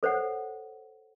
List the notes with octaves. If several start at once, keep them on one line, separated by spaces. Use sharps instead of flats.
A4 C5 C#5 F#5